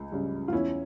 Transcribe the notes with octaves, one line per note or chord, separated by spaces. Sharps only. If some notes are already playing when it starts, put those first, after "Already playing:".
Already playing: C#2
C#3 G3
F4
E2 C#4 E4